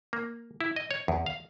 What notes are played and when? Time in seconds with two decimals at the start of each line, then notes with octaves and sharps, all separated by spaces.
0.13 A#3
0.61 E4
0.76 D#5
0.91 C#5
1.08 E2
1.26 F5